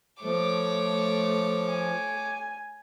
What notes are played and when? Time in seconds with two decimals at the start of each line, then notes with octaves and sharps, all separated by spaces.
0.23 F3 A3 C#5 D6
1.70 G#5